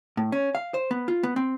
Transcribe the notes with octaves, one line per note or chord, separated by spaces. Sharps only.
A2
C#4
F5
C5
B3
F4
B3
C4